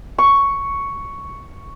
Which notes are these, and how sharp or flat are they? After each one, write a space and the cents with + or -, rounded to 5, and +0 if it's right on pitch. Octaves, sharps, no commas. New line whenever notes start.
C#6 +5